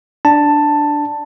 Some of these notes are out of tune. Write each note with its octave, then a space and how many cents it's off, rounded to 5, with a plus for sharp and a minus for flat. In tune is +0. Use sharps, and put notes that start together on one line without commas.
D4 +0 A5 +10